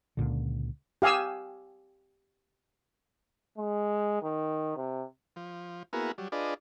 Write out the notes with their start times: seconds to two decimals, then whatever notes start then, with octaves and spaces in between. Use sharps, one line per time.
0.17 C#2 A#2 D3
1.02 G4 F5 G#5 D#6 E6
3.58 G#3
4.23 D#3
4.76 C3
5.36 F3
5.93 A#3 B3 E4 F#4 G#4 A#4
6.18 F#3 G3
6.32 D4 F4 G#4 B4 D5 D#5